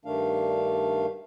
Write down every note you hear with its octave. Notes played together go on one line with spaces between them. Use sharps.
G2 D#3 A3 D4 F5